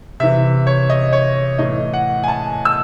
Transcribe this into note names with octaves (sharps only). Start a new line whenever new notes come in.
C3 E3 E5
C#5
D#5
C#5
A2 E3 D#5
F#5
G#5
A5
E6